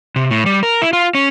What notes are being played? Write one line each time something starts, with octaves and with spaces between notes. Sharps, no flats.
C3
A2
G3
A#4
E4
F4
C#4